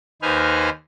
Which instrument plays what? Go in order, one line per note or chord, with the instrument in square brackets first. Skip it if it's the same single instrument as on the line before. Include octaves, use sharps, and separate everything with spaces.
[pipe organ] D#2 D#4 B4 C5 G#5 F6